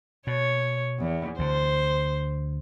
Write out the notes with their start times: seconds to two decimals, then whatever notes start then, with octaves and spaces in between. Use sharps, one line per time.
0.27 B2 C#5
0.99 E2
1.39 D2 D3 C5